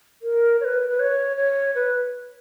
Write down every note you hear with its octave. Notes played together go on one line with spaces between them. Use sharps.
A#4
C#5
B4
B4
C#5
C#5
B4